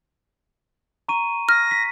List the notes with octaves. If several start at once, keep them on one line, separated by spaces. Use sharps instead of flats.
A#5 C#6 D#7
F6 A#6
B6